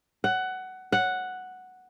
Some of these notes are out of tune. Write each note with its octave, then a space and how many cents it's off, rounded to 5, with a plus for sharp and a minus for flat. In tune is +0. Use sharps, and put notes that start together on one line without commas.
F#5 +15
F#5 +0